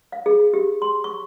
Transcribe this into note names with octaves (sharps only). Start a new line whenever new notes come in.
F5
G#4
G4
C6
C#6